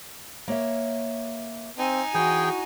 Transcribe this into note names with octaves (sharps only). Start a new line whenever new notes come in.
A#3 C#5 E5
C4 D#4 G#5
E3 F#4 G#4 G5